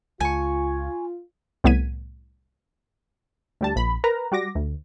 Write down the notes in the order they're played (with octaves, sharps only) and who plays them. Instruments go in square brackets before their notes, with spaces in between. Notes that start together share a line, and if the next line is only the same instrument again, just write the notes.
[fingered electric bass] C#2 [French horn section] F4 [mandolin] G#5 C#6
[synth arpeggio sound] C2 A2 B3 G#6 B6 D#7
[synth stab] D2 G3 A5
A#1 B5
A#4 B4 A#5
G3 F#4 D6 A#6
D2